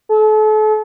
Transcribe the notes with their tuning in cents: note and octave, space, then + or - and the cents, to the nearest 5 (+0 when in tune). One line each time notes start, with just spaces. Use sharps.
A4 -35